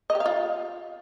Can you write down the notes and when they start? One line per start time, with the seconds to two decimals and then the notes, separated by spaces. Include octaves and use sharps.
0.10 D#5
0.15 G4
0.20 F5
0.26 F4